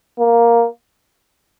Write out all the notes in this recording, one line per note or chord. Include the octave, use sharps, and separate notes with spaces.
A#3